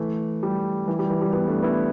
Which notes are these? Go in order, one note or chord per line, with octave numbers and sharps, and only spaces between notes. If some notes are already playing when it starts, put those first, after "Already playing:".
Already playing: E3 A3
G3
E3
G3
E3
G3
G3 B3
A3 D4
B3 E4